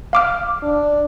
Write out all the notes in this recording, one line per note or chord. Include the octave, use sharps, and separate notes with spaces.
F5 D6 F6
D4